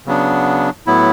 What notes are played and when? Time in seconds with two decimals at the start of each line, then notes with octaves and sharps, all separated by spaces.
0.06 C#3 F#3 B3 D4
0.86 A2 F#3 B3 E4